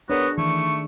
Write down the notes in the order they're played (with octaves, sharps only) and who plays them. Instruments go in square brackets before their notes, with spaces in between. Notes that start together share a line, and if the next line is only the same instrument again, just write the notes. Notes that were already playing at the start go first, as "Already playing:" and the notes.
[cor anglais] B3 [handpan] D4 G#4 [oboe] F#4 [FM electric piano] A#4 B4 C#5
[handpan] D#3 [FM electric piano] E3 [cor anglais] A3 [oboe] C#6